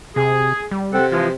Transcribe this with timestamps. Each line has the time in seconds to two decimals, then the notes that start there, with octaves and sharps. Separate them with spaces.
0.16 C3 G#4
0.71 G3
0.93 C3 C4 A4 F#5
1.12 E3 F3 G#3 F4